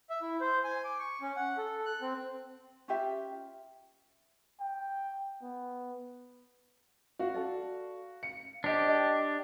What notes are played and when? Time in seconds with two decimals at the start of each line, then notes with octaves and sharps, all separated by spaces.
0.10 E5
0.22 E4
0.40 C5
0.64 G#5
0.84 D6
0.99 C#6
1.21 C#4
1.36 F#5
1.57 A4
1.86 F#6
2.02 C4
2.88 C#4 F4 G4 E5
4.60 G5
5.42 B3
7.19 F#4 F5
7.34 A4 D5
8.23 F5 C#7
8.64 D4 G4 C5 D#5
8.88 D#5 G5